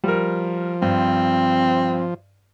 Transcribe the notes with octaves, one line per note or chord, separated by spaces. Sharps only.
F3 G3 A#4
G2 C4